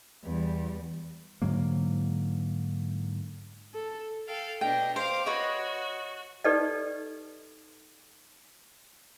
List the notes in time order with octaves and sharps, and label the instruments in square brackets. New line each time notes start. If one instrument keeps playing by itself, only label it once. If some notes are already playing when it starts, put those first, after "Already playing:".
[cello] E2 G3
[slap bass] G#2 D3 F#3 A#3
[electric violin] A4
[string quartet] A4 F5 G5
[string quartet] B2 D4 D#5 [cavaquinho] G5
[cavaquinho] C5 [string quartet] F5 D6
[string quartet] F#4 [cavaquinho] B4 C#5 D#5
[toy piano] D#4 G4 A4 B4 D5 D#5